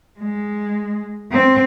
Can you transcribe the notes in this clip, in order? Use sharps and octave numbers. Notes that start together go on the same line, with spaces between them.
G#3
C4